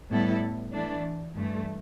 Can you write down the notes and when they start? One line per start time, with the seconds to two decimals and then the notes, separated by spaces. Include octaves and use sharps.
0.09 A2 G3 B3 E4 A4
0.72 E3 A3 D4
1.35 G2 E3 A3